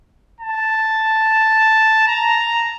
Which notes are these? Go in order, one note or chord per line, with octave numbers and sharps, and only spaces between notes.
A5
A#5